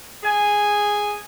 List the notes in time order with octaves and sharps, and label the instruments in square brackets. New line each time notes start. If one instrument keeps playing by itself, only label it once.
[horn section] G#4 G#5